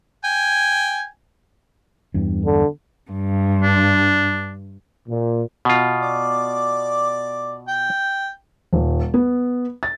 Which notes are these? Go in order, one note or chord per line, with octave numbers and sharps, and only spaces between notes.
G5 G#5
E2 G2
D3
G2
D4
A#2
B2 F4
D5 D6
G5
D#1
B3
A6